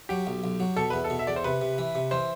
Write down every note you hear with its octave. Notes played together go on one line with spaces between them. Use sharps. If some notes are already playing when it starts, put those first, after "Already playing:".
F#3 G4
B1
B1
F#3
B2 A4
E2 B4
A4
B2
E5
E2 D5
C5
C3 B4
C3
E3
C3
E3 C5